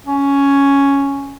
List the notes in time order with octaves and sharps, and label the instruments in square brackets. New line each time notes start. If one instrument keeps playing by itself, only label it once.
[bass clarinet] C#4